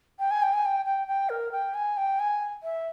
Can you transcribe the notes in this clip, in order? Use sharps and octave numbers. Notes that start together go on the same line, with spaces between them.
G5
G#5
G5
G#5
G5
G5
G5
A#4
G5
G#5
G5
G#5
E5